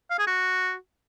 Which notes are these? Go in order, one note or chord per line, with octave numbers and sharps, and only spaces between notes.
F5
G#4
F#4